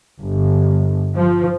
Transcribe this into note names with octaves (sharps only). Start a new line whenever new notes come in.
G1
F3